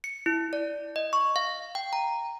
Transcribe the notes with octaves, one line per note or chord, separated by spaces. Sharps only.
C#7
E4
D5
D#5
C#6
F5
G5
A#5